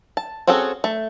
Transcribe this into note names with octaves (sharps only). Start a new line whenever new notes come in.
A5
C4 C#4 F#4 G#4 A4
A3